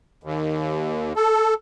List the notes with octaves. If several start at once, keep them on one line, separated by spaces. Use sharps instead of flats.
D#2
A4